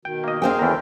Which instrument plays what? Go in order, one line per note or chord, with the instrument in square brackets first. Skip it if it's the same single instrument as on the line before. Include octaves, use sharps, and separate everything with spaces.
[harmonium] B2 D#3 [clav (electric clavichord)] G5
[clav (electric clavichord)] A#3 D#5
[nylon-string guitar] C4 C5 G5 [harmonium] G#4 A#4 F5
[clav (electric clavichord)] E2 A#4 [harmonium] A4